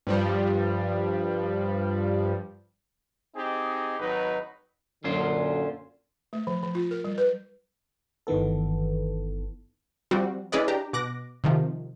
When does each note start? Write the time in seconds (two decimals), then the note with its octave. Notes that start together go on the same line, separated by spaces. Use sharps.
0.07 G2 F3 G3
3.35 C4 D#4 G4 G#4
4.00 G#1 F#3 D#4 B4
5.04 F#2 A#2 D3 C#4 F4 C5
6.33 A3
6.47 F3
6.63 F3
6.75 F4
6.91 A#4
7.04 G3
7.18 B4
8.27 G1 D#3 E3 B3 A4
10.11 F3 G3 C4 F#4
10.52 C#4 E4 G#4 B4 D5 D#5
10.68 D4 G4 A#5
10.93 B2 D6 F#6 A#6
11.44 C3 D#3 F3